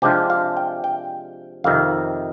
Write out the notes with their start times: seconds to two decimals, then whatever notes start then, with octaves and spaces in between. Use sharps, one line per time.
0.02 C3 F3 G#3 D4 F4 G4
0.30 F5
0.57 G5
0.84 G5
1.64 F2 C3 D#3 F5